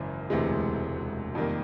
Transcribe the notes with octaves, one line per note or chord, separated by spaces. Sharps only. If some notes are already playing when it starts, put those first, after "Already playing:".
Already playing: G#1 F#2 C#3 E3
E1 D2 C3 E3 G#3
F2 C3 D#3 G3 A#3